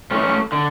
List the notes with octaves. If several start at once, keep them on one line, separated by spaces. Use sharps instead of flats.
A2 E3 A3 C#4
D3